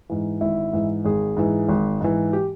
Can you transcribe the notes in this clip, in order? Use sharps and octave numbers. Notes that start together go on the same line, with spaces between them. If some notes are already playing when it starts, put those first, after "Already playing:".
G#2 E3
G#1 E4
G#2 E3
G#1 G#4
G#2 E3
G#1
G#2 E3
G4